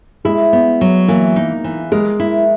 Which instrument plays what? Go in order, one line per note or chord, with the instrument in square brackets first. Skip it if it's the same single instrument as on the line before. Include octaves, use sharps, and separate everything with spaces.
[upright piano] G#3 [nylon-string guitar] E4
[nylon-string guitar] B3
F#3
[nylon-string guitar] E3 [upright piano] A#3
[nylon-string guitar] D#4
E3
[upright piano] G#3 [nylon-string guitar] A#4
[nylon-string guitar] E4